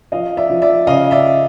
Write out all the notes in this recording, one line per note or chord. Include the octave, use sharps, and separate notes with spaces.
F3 D#5 F5
D5 E5
F3
D5 E5
C#3 D#5 F5
D5 E5